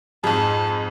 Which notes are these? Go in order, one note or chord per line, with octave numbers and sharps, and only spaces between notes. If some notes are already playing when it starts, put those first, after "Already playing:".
F2 G#2 G#4 A5